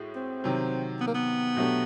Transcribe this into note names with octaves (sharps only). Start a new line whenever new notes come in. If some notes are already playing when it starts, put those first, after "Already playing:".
Already playing: A2 G#3 F#4
C4
C3 D#3 F#3
B3
A#3
B3
B2 F#3 A3 D4 G4